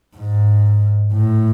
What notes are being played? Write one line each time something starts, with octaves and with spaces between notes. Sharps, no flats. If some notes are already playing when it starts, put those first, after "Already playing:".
G#2
A2